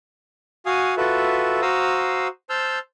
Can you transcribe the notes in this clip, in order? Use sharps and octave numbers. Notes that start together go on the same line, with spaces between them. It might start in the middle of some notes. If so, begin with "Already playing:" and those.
F#4 F5 G#5 D#6
F4 F#4 A4 B4 E5
F#4 C5 F5 A#5 D#6 E6
C5 A5 E6 F6 G6